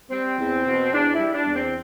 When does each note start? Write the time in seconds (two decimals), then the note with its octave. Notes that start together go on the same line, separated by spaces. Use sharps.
0.11 G3 C4
0.38 E2
0.65 B2
0.92 E2 D4
1.12 E4
1.18 G3
1.33 D4
1.46 E2
1.53 C4